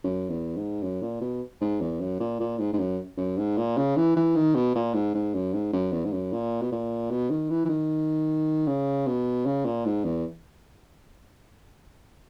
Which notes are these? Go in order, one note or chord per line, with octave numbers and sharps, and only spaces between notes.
F#2
E2
G#2
F#2
A#2
B2
G#2
E2
F#2
A#2
A#2
G#2
G#2
F#2
F#2
G#2
A#2
C#3
E3
E3
D#3
B2
A#2
G#2
G#2
F#2
G#2
F#2
E2
G#2
F#2
A#2
B2
A#2
B2
D#3
E3
E3
D#3
C#3
B2
C#3
A#2
G#2
E2